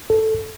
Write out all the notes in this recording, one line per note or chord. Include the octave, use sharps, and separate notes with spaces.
A4